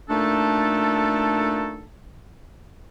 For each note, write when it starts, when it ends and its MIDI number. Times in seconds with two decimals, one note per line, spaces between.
0.10 1.85 46
0.10 1.85 57
0.10 1.85 62
0.10 1.85 63
0.10 1.85 69